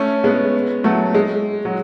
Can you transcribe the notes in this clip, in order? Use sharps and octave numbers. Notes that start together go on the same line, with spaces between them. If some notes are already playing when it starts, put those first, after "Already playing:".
Already playing: A3 C#4
G#3 B3
F#3 A3
G#3
F#3